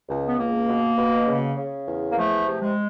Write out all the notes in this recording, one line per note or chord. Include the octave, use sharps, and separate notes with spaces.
C#2
B3
C#2 A#3
B2
B2
C#3
C#3
E2
A#3
F3 A3
C3
G#3